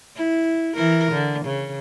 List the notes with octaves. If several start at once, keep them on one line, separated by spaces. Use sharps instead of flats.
E4
E3 A#4
D3
C#3